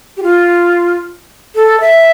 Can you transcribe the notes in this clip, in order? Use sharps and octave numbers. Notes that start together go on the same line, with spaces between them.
G4
F4
A4
E5